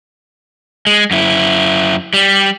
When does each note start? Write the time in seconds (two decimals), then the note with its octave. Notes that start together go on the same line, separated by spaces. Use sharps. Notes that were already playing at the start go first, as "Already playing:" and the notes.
0.87 G#3
1.11 F#2 E4
2.14 G3